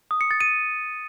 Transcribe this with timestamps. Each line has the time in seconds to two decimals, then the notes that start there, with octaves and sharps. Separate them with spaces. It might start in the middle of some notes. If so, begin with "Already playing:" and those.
0.11 D#6
0.21 C#7
0.31 A6
0.41 D#7